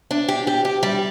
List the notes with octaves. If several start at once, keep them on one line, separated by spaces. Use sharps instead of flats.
D4
G4
G4
G4
G3